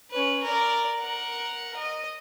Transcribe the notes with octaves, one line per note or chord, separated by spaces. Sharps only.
C#4 B4
A#4 D5
A#4 F#5
D#5